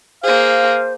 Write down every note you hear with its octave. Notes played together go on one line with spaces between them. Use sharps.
A#3 G#4 C5 F5